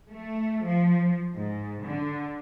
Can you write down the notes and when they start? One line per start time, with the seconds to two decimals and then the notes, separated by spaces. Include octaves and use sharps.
0.10 A3
0.65 F3
1.34 G#2
1.83 D3